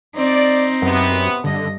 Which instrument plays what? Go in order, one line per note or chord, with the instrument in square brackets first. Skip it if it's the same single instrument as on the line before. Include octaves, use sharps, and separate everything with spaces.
[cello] C4 D#4 [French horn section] D5
[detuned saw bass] F#2 [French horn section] C3 B3
[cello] G2 D#5 [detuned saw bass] D3